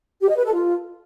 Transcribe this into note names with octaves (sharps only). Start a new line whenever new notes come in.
G4
D#5
B4
A4
F4